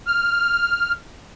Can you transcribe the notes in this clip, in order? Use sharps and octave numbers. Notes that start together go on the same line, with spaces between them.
F6